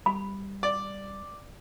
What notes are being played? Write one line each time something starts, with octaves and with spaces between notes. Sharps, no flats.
G3 B5
D5